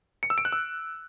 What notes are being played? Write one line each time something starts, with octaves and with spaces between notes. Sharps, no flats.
C#7
E6
D7
F#6
E6